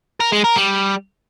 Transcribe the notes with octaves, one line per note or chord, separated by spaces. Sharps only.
A#4
G#3
A#4
G3